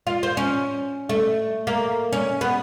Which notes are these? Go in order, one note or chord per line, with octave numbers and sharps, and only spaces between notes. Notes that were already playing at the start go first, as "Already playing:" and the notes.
F4
C5
C#4
A3
A#3
C#4
B3